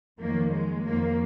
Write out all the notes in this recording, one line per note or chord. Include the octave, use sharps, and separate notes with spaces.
F2 D#3 F#3 A#3
G#3
F2 D#3 F#3 A#3